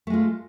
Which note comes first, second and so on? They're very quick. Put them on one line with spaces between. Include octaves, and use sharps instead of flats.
A3 G#3 F4